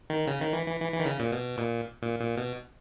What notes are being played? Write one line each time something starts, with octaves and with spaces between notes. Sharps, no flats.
D#3
C#3
D#3
E3
E3
E3
E3
D#3
C#3
A#2
B2
A#2
A#2
A#2
B2